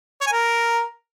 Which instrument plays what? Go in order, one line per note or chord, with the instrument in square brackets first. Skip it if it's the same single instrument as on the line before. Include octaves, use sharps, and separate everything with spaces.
[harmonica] C#5
G#5
A#4